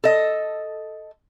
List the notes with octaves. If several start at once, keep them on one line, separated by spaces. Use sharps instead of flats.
A4 D#5